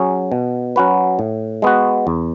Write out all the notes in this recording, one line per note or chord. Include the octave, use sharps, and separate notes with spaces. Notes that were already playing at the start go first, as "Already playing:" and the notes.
Already playing: F#3 C#4 G#4
B2
F#3 C#4 F#4 B4
A2
G#3 B3 F#4
E2